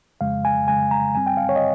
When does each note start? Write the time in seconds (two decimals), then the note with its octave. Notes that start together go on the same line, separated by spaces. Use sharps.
0.21 F2 C#3 G#3 F5
0.45 G#5
0.68 F2 C#3 G#3 G#5
0.91 A#5
1.15 G2 G3 C4 G#5
1.27 G5
1.37 F5
1.49 C#5
1.56 D#5